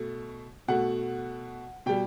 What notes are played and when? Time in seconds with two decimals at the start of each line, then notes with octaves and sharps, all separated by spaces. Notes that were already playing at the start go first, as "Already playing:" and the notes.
Already playing: B2 A3
0.68 B2 A3 F#5
1.86 B2 G3 G5